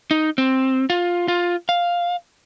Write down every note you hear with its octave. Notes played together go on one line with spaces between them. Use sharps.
D#4
C4
F4
F4
F5